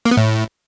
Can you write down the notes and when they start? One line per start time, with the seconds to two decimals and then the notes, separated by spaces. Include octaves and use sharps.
0.05 A#3
0.11 B3
0.17 A2